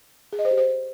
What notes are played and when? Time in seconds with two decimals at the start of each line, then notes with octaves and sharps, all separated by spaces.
0.33 G#4
0.39 D#5
0.45 C5
0.51 G4
0.57 C5